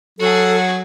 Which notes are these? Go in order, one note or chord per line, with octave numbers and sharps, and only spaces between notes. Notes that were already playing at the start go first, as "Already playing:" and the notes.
F#3 F#4 G#4 A4